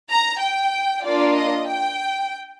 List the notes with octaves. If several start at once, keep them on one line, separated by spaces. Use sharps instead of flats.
A#5
G5
A#3 D4 F4 D5
D#5
G5